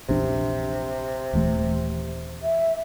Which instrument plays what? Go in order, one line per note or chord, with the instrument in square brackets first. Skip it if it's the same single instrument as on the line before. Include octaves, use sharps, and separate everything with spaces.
[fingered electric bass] A#1 E2 D4 [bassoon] C3
[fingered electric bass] D#1 E3 A3
[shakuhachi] E5